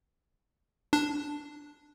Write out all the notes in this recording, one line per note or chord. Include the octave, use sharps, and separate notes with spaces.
D4